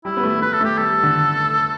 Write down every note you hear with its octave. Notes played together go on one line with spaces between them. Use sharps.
G3 E4
B3
A3
B3 B4
A4
A3 G4
G3 A4
D3